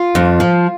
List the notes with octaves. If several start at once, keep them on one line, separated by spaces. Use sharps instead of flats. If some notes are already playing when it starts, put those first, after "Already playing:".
Already playing: F4
F2
F3